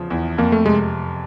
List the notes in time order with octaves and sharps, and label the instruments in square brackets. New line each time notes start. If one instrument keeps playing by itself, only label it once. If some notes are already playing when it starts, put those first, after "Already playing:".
Already playing: [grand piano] E2 C#3 F3
E2
[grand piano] F2 [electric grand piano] A#3
[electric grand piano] A3
[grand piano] C3 [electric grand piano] G#3